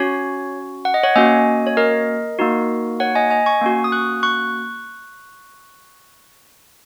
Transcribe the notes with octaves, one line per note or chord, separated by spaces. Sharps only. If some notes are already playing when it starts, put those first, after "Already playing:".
Already playing: C#4 F#4 C#5
F#5
D#5
C#5 F#5
A#3 C#4 F#4 D#5 G#5
C#5
A#4 D#5
A#3 D#4 F#4
C#5 F#5
D#5 G#5
D#5 G#5
G#5 C#6
A#3 C#4 F#4
D#6
C#6 F#6
C#6 F#6